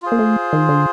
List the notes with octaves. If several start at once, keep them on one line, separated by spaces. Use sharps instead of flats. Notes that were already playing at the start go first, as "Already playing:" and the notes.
F4 G#4 C5
A#3
A3
D#3
D3